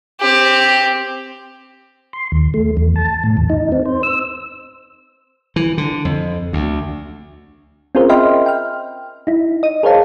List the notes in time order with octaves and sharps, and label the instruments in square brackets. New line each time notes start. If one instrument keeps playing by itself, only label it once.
[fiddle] C4 G4
[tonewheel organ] C6
D#2
A3
E2
A5
A2
E2
D#4
C4
C5
E6
[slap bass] E3
D3
F2
D2
[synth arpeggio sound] C4 C#4 F4 G#4 A#4 C5
D#5 E5 G5 B5 C6 F6
G5 F6
D#4 E4
D#5 D#7
G#4 A#4 C5 C#5 F5 A5